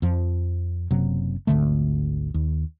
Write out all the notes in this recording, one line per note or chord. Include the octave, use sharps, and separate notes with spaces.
F2 F3
F#1 C3 F#3
G#1 D2 D3 A3
D#2